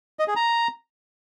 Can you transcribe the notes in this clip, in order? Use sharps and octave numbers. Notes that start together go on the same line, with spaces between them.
D#5
G#4
A#5